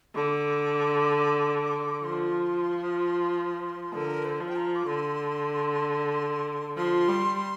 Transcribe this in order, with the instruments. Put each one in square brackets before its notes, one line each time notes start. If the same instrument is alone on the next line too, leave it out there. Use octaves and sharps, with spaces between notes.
[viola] D3 [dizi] D6
[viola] F3 [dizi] C6
[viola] D3 [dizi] A#4
[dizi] C5
[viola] F3
[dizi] G5
A#5
D6
[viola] D3 [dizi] C6
[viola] F3 [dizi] C6
[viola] G3